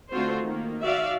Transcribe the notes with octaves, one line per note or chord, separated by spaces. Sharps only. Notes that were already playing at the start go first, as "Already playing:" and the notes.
D3 A3 C4 F4 F#4 C5
D#3 A#3
F#4 D5 E5 F5